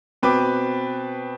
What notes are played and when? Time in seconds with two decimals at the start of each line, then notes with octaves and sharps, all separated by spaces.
0.23 B2 C4 B4 D6